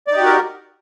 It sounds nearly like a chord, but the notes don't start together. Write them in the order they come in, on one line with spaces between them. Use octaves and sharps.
D5 D#4 G4 F#4 A#4